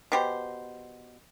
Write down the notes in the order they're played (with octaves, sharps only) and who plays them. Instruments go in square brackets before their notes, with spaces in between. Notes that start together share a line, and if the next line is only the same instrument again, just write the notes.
[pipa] B2 G4 C5